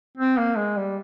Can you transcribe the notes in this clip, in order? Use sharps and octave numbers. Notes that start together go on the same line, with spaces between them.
C4
A#3
G#3
G3